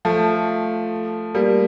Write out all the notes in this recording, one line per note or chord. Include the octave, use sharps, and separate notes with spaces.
F3 A3
G3 A#3